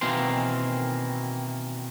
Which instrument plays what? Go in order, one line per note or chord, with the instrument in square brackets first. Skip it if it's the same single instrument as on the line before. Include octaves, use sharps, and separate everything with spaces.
[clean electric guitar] B2 D#3 E3 A#3 C4 C6